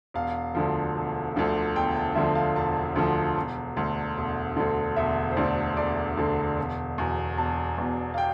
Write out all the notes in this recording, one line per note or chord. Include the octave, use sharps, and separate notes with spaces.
E1 F5
D2 D3 F3
E1
D2 D3 F3
E1 G5
A5
D2 D3 F3 E5
F5
E1 A5
D2 D3 F3
E1
D2 D3
E1
D2 D3
E1 E5
C5
D2 D3 D5
E1 D5
D2 D3
E1
E2 B2
E1 A5
E2 B2
F5
G5